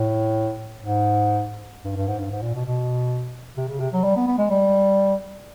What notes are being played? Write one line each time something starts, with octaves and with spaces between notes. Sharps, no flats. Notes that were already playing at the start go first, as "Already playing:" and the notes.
Already playing: A2
G#2
G2
G2
G#2
G2
G#2
A#2
B2
B2
C3
C#3
C3
F#3
G3
B3
B3
G#3
G3